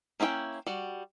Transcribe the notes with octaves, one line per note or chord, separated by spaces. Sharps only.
A#3 C#4 E4 B4 G5
G3 F#4